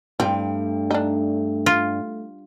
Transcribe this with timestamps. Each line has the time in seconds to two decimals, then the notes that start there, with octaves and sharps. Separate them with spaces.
0.20 G2 A3 C4
0.91 D4 D#4
1.66 F4